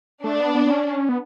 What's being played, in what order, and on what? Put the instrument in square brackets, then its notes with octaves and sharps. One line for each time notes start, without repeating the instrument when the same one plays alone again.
[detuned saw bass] A3 [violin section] D4
[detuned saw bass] B3
B3
B3
C#4
C#4
B3